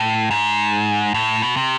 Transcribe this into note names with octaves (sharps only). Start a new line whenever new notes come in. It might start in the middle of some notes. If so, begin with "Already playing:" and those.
Already playing: A2
G#2
A2
B2
C3